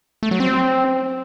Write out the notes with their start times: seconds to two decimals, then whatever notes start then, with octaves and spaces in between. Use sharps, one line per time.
0.23 A3
0.31 F#3
0.40 C4